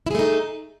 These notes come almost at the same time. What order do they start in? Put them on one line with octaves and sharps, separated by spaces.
E4 G#4 A3 D#4